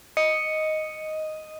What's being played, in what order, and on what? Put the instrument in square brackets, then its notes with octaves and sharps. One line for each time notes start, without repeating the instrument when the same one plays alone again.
[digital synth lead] D#5 [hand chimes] C#7